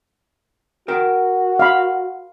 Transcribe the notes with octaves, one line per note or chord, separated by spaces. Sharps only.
F#4 A#4 G5
F5 B5